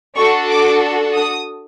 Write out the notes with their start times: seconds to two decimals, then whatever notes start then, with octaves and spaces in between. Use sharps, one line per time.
0.16 D4 F#4 A4 C#6
0.49 D6
1.15 D#6